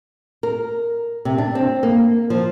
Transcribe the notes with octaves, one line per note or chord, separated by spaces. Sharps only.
A#4
C3
D4
C4
A#3
F3